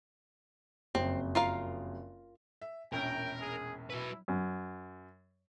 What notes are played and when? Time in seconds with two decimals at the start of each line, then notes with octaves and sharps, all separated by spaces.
0.95 F#1 F2 C4
1.35 F4 A#4 F5
2.62 E5
2.93 E1 A#1 C#4 A#4 G5
3.41 G#4
3.90 F#3 E4 B4
4.28 F#2